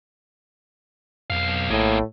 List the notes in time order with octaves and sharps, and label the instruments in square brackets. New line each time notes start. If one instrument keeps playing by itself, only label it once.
[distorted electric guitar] B1 F5 [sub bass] F2
[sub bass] A#1 [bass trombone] A2 [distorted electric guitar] A#3 G#4